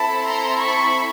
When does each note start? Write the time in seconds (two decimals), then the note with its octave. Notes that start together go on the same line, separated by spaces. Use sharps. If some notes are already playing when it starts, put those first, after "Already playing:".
Already playing: C4 E4 A4 A5 B5
0.25 A#5 C6
0.59 B5 C#6